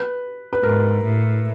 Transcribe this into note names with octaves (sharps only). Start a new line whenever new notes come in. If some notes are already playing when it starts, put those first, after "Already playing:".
Already playing: B4
B4
G#2 A#4
A2